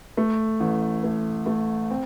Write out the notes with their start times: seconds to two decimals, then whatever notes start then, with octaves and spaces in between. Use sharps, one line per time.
0.17 A3
0.60 A1
1.04 A3
1.46 A3
1.90 C4